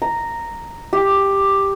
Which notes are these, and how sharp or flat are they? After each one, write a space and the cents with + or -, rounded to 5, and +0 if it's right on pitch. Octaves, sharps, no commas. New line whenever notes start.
A#5 -5
G4 +5